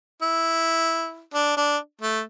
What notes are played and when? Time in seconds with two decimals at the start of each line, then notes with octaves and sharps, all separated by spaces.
0.22 E4
1.34 D4
1.57 D4
2.01 A3